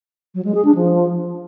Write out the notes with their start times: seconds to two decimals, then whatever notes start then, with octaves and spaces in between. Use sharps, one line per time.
0.35 F#3
0.45 G#3
0.55 G#4
0.65 D4
0.75 F3